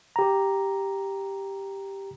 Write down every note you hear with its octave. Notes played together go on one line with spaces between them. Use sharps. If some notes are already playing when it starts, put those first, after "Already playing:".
G4 A#5